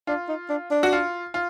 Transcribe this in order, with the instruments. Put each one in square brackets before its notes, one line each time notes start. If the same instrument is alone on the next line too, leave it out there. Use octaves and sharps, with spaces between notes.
[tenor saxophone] D4 [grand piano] F4
[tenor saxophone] D#4
D4
D4
[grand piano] F#4
F4
F4